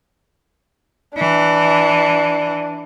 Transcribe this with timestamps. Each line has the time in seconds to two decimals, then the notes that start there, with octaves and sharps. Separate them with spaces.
1.18 E3 D4